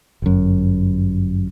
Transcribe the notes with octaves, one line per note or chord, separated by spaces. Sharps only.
G1 F#2